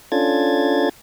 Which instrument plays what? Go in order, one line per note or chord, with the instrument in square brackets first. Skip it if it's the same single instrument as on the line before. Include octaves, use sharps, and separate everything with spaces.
[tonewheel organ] C#4 D4 F4 A4 G#6 A6